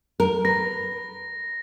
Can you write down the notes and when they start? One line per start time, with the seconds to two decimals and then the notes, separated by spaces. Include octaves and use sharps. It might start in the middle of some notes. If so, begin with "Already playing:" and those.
0.20 A#4
0.45 B4 A#6